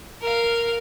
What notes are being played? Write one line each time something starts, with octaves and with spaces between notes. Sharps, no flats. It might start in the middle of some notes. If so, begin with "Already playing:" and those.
A#4 F5